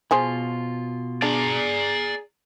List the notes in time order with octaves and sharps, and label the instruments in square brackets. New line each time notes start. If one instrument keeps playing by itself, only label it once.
[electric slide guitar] B2 F4 [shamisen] F3 G#4 C5
[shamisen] D4 [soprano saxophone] G#4 [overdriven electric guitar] D5 A#5